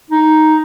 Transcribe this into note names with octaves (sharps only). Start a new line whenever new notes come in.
D#4